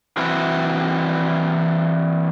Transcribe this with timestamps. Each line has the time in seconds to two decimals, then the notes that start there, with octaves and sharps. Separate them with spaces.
0.17 E3 C4 E4 F#4